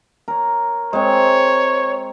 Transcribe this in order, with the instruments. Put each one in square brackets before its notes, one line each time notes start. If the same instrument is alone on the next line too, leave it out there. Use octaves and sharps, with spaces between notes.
[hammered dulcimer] A#4 C#5
[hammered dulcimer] G#3 C4 [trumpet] C#5